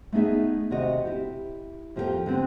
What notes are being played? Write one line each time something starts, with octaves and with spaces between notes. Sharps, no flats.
A3 B3 D#4 G#4 E5
D#2 C3 F#4 D#5
E4 G4
F2 F3 G4 G#4 A#4 G5
D3 B3 C4